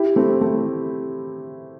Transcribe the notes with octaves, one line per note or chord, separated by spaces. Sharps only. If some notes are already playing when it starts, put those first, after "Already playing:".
Already playing: E4 G4
A3 C4
A3